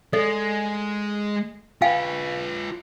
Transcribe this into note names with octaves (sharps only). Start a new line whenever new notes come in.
G#3 A4 D5 D#5
F4 B4 F5 G5 G#5